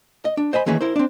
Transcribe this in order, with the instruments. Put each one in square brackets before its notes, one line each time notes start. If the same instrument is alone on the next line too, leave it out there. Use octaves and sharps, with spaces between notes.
[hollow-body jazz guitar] D#5
D4
C5 D#5 G#5 B5
D#3 E3 A#3 C#4 G#4 B4
E4 A#4 C5
C4 D4